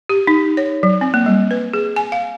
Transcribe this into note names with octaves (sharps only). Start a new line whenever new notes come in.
G4
D#4
C#5
F#3
C4
A#3
G3
B4
G#4
G#5
F5